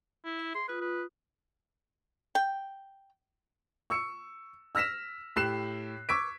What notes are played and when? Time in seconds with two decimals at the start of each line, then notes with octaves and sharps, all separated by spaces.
0.24 E4
0.39 E5
0.54 G#4 C6
0.68 F4 B4 D#6
0.80 B4
2.35 G5
3.90 C#6 E6 C#7
4.75 E6 F6 A#6 B6 E7
5.36 A2 G4 F#6 C7 E7
6.09 C#6 D6 E6 G#6 B6 D7